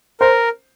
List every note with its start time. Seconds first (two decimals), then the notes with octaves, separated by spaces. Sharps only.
0.20 A#4 C5